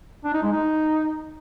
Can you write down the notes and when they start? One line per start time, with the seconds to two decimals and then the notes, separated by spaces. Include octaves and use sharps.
0.24 D4
0.34 D#4
0.43 G#3
0.52 D#4